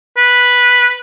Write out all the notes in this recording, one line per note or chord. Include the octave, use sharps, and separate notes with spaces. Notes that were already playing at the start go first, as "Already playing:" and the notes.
B4